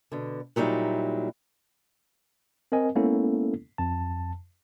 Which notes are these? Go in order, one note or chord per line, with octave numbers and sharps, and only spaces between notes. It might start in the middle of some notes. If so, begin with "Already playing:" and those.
B2 D3
A#2 F#3 G3 D#4 E4
C4 A#4 D#5 G#5
G#3 A#3 B3 C#4 E4 A4
F2 A5